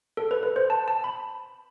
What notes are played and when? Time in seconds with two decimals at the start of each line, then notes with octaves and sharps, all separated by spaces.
0.17 A4
0.31 B4
0.43 B4
0.56 C5
0.70 A5
0.88 A5
1.04 B5